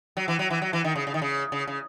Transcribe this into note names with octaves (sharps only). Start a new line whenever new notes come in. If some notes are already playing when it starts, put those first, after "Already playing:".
F#3
E3
F#3
E3
F#3
E3
D#3
C#3
C#3
D#3
C#3
C#3
C#3